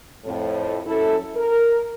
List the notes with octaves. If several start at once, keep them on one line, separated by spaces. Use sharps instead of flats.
F2 A2
F#2 E4 A4
A#4